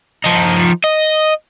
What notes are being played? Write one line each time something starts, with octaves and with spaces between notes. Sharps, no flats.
F3 D#4
D#5